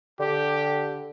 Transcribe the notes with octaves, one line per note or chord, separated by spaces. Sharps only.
D3 G4